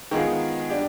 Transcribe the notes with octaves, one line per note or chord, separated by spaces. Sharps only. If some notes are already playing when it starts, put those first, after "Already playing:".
D#3 G#3 B3 F4 G#4
G3 D4 G4